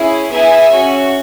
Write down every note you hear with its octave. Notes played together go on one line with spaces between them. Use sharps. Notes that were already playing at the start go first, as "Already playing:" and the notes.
Already playing: C#4 E4 G#4
B3 E4 G#4 E5 G#5
C#4 F#4